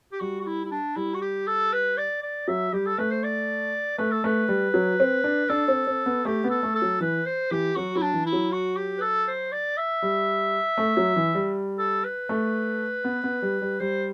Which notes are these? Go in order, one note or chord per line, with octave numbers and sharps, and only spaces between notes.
G4
G3 F#4
F#4
E4
E4
D4
G3 E4
F#4
G4
A4
B4
D5
D5
F#3 E5
G3 G4
A4
A3 B4
C5
D5
A3 B4
A4
A3 B4
G3
F#3
C4
D4
D4 A4
C4
C4
B3
A3 G4
B3
A4
A3
A4
F#3
E3 B4
C5
E3 G4
F#3 F#4
F#3 E4
D4
E3
E4
F#3
F#4
G4
B4
A4
C5
D5
E5
G3
A3
F#3
E3
G3
A4
B4
A3
B3
B3
G3
G3
G3 C5